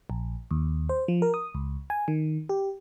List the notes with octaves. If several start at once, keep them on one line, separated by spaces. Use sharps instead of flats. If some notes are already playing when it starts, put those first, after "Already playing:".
A#1
D#2
C5
F3
A#4
D#6
C#2
G#5
D#3
G4